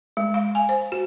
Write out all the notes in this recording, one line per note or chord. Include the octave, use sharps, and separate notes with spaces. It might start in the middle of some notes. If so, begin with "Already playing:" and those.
G#3
F5
G#5
C5
F#4